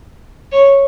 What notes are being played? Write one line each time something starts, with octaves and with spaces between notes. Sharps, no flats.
C#5